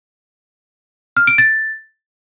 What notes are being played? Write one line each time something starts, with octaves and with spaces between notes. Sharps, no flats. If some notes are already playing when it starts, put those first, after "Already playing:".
F6
D7
A6